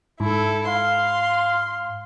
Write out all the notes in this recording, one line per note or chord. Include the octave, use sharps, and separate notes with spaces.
G#2 E4 A4
F5 C6